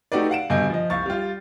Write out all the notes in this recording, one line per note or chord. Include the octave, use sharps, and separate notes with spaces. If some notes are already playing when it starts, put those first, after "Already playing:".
A3 D#4 F#4 G4 B4 D5
F5 F#5 D7 E7
G2 B2 D3 D#5 G#5 G6
F3 D#5
C2 F5 C#6 A6
G3 F4